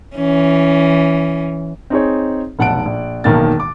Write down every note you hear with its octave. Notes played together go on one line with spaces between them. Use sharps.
E3 C#4
C4 D#4 G#4 C#5
F1 B1 F#5 A5 F#6 D7
A#1
E1 B1 D#3 A#3 A6
D6